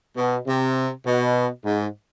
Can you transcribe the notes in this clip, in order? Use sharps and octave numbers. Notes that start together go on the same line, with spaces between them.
B2
C3
B2
G#2